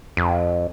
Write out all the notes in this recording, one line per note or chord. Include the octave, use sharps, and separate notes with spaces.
F2